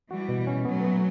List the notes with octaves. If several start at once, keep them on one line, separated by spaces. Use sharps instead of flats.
E3 G3 F#4
B2
C#4
F#3 A3 B3
B3